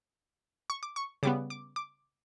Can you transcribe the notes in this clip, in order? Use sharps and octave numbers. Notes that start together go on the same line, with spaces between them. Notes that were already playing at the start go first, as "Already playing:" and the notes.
C#6
D6
C#6
C#3 G3 B3 D6
D6
D6